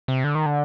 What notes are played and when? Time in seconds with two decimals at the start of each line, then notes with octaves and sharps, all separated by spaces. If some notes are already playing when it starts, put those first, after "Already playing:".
0.08 C3
0.24 D3
0.35 D#3
0.46 D3